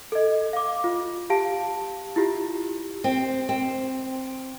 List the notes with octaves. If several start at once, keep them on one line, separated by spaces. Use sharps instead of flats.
A4 D#5
F5 D6
F4
G4 F5 A5 D7
E4 F4 G4
C4
C4